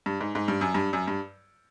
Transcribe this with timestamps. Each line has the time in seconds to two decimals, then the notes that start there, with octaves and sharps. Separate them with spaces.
0.06 G2
0.21 G#2
0.35 G#2
0.48 G2
0.61 F#2
0.74 G2
0.93 F#2
1.08 G2